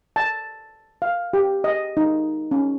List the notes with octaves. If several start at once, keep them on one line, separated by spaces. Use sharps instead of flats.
A5
F5
G4
D#5
D#4
C#4